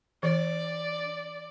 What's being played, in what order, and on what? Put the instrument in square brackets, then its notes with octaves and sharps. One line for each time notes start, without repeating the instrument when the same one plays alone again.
[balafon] E3 [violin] D5